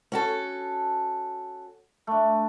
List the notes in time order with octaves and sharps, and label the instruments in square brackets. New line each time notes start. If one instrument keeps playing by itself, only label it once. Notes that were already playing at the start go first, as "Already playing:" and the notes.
[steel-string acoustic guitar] C#4 F#4 A4
[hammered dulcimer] A3 D4